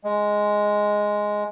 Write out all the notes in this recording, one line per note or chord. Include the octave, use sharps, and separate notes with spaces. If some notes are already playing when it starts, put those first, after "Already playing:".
G#3